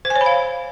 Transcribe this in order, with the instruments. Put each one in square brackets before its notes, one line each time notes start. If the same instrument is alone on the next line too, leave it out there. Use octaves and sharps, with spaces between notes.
[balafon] C5
G#5
C#5
B5
F5